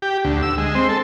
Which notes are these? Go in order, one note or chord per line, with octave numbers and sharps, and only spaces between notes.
G4
D2
E6
G#3
C4
A4